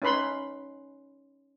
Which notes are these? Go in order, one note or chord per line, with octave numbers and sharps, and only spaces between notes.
C#4 D#4 B4 B5 C6